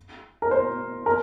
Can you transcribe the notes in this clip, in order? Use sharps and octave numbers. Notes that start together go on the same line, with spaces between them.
A#4
C5
A#4